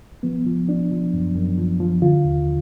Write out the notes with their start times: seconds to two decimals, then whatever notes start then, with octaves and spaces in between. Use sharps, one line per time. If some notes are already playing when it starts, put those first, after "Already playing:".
0.23 F3 B3
0.46 F3
0.68 F3 D4
0.91 F3
1.14 F#2
1.36 F#2
1.57 F3
1.80 F3
2.02 D3 F4
2.25 D#2